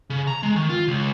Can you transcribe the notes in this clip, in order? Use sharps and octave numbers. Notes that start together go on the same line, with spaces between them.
C#3
A#5
G#3
D#3
F4
C#2